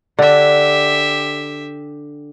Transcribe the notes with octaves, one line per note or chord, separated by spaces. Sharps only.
D3 G4 E5